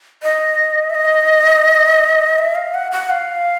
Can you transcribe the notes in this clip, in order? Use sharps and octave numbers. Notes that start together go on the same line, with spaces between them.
D#5
E5
D#5
E5
F5
F#5
F#5
F5